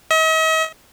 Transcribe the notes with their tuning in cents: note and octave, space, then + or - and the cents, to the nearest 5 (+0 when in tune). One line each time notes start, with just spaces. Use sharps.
D#5 +45